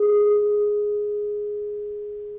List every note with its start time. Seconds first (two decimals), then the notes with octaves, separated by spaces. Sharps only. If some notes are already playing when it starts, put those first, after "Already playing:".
Already playing: G#4